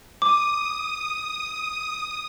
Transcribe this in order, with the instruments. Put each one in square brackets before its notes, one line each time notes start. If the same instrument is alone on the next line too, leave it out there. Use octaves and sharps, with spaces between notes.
[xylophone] D6 [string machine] D#6